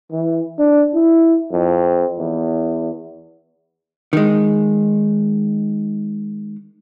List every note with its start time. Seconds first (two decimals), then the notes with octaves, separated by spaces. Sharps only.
0.11 E3
0.59 D4
0.94 E4
1.52 F2
2.18 E2
4.13 D#3 G#3